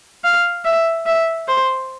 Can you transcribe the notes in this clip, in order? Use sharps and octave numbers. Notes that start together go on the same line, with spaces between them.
F5
E5
E5
C5